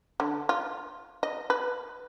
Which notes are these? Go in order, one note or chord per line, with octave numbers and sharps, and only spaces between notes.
D3
F4
D#5
B4